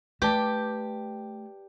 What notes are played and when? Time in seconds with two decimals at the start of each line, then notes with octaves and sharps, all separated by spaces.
0.22 A3 G4 B4 D5 A5